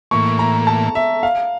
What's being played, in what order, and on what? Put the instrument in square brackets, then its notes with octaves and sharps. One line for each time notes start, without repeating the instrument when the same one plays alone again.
[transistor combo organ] A2 E3 A#3 [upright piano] C#6
[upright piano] A#5
A5
E5
F5